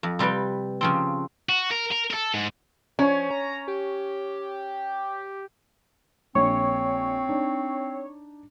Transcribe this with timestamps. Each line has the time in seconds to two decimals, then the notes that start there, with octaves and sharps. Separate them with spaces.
0.03 F2
0.19 C3 G3 G4 B4 G5
0.81 C#3 F3 C4
1.49 F#4
1.72 A#4
1.92 A#4
2.11 A4 A#4
2.34 G#2
2.99 F3 C#4 C#5
3.31 A#5
3.68 G4
6.35 A#1 C4 C#5 C#6
7.29 D4 D#4